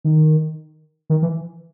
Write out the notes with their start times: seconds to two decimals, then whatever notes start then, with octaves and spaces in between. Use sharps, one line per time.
0.04 D#3
1.10 D#3
1.22 E3